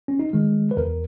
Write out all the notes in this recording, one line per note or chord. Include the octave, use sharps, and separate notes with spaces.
C#4
D#4
D#3 G#3
B4
E2 A#4